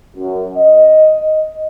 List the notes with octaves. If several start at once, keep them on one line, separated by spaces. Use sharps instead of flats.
F#2
D#5